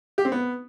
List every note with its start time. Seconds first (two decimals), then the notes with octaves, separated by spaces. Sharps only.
0.18 G4
0.25 C4
0.32 B3